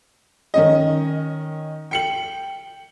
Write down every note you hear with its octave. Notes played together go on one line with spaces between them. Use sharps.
D#3 C#4 D#5
G5 C#7 F#7